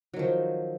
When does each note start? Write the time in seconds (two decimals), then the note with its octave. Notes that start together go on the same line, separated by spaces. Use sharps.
0.14 F#3
0.16 D#3
0.19 F3